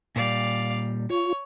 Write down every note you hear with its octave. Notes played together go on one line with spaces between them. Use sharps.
A#2 G3 D5 F5
F4 C#5